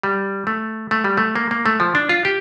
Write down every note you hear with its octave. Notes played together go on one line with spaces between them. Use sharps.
G3
A3
A3
G3
A3
A#3
A#3
A3
F3
D4
F4
G4